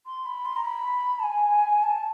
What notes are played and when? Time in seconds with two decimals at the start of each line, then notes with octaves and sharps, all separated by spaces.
0.06 C6
0.25 B5
0.45 C6
0.56 A#5
0.64 B5
1.19 A5
1.23 G#5
1.83 A5